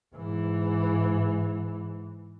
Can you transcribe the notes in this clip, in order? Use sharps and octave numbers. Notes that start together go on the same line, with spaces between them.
G#2 E3